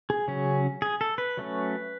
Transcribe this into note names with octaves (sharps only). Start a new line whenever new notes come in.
G#4
C#3 F#3 C#4
G#4
A4
B4
F#3 A3 C#4